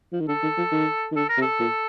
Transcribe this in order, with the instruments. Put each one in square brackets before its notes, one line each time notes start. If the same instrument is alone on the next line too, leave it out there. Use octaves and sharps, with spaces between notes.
[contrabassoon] F3
D#3
[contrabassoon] D3 [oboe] A4
[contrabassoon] D#3
F3
D#3
D#3
[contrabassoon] D3 [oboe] A4
[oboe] A#4
[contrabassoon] C3
[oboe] A4
[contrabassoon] A#2